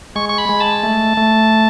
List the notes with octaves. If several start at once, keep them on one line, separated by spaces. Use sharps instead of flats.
G#3 C#6
C#6
B5
G#3
A5
A3
A3